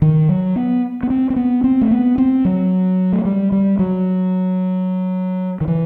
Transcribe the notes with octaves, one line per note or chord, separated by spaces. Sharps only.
D#3
F#3
B3
B3
C4
C4
B3
C4
A3
B3
C4
F#3
A3
G3
G3
F#3
D#3
E3